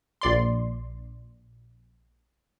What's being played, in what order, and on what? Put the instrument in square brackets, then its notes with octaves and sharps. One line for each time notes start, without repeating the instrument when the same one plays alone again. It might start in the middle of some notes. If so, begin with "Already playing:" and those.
[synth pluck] A#1 D5 C6